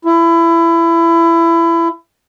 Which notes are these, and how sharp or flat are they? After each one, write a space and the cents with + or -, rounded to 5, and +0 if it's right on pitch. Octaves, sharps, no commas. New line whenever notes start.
E4 +25